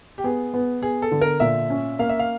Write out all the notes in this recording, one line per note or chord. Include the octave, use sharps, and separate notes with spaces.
G4
B3 G#4
B3
B3 G#4
A4
D3
A#4
A#2 E5
C#4
A#3 F5
E5
F5